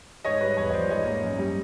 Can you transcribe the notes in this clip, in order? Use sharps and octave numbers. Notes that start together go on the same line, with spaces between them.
G#2 C#5 D#5
G3 B4 C#5
E2 B4 C#5
D#5
F3 C5 D5
G#2 C#5 D#5
A#3
F#2
G3